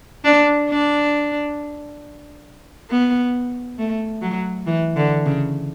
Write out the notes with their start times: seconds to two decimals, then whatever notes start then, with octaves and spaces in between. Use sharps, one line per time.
0.25 D4
0.69 D4
2.90 B3
3.79 A3
4.22 F#3
4.66 E3
4.96 D3
5.26 C#3